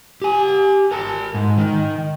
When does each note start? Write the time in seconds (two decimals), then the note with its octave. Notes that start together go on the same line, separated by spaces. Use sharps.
0.22 G4 G#5
0.91 A#4 A5
1.34 G#2
1.58 D#3